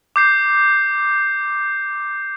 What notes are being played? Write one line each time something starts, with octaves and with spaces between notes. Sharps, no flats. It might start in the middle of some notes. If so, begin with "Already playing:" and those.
D6 G6 C7